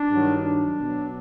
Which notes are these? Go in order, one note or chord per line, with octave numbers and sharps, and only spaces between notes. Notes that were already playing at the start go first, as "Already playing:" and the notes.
Already playing: D4
G2 D#3 F#3
D4
B2 F#3